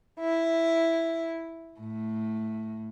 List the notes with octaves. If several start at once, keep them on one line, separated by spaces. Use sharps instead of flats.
E4
A2